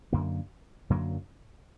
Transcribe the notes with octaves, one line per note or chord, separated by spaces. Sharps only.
F#2 D3 F#3 A#3
F#2 D3 F#3 A#3